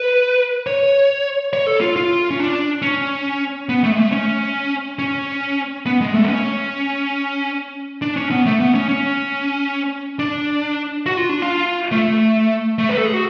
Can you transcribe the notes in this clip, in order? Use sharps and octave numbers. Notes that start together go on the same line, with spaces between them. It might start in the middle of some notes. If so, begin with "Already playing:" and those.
Already playing: B4
C#5
C#5
A4
F4
F4
C#4
D4
C#4
B3
A3
G#3
A3
C#4
C#4
B3
G#3
A3
B3
C#4
D4
C#4
B3
A3
B3
C#4
C#4
D4
F#4
F4
D4
F4
A3
A3
B4
A4
G#4
F#4